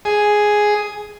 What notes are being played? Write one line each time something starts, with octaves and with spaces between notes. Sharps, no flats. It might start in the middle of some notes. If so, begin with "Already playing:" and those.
G#4